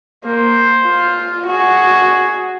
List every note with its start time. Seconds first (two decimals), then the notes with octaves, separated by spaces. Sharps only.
0.25 A#3 C5
0.85 F4
1.46 F#4 G#4